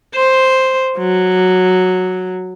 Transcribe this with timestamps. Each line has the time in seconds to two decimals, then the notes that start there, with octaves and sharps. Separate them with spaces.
0.15 C5
0.98 F#3